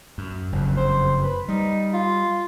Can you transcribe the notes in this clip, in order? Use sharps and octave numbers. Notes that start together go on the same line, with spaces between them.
F#2
F#1 F2
C5
B4
G3 D#4
F4